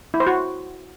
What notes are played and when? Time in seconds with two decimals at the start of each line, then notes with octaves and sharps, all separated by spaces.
0.14 E4
0.20 C5
0.27 F#4